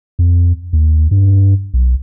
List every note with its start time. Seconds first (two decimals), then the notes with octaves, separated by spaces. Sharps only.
0.19 F2
0.73 D#2
1.11 G2
1.74 B1